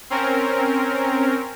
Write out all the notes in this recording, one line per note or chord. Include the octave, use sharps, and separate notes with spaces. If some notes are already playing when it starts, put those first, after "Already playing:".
C4 C#4 A#4